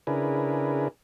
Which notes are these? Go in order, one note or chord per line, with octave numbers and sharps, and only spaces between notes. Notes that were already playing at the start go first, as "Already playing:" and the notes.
C#3 D4 E4 G#4 A#4 B4